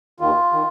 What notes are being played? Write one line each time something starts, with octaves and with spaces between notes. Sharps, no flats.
D#2 D#3 F4
D#3